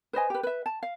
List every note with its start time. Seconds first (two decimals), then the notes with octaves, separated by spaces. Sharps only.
0.13 B4 C5 D#5 G#5
0.30 G4 B4
0.43 B4 E5
0.66 A5
0.83 F5